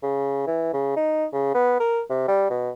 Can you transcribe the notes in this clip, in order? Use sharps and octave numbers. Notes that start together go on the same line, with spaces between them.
C#3
E3
C#3
D#4
C#3
B3
A#4
C3
G3
B2